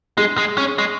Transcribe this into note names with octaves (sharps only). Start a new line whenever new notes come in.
G#3 G#4
G#3
C#4
G#3